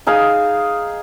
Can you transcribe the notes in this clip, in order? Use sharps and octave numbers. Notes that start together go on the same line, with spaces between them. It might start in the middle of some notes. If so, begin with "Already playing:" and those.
D#4 G#4 F5